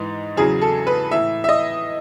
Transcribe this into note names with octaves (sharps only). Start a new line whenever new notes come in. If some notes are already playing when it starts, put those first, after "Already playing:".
Already playing: G#2 E3 D#4
E2 C#3 F#3 G#4
A4
B4
A2 E3 E5
E5
D#5